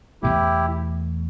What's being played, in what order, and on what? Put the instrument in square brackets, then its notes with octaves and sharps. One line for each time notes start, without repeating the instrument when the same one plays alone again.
[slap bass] E2 B2 A3 [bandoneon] E4 G4